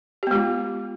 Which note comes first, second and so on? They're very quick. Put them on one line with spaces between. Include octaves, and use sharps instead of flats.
G4 B3 G#3 F4